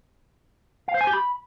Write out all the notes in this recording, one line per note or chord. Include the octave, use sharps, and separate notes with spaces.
F5
C5
G#5
G4
B5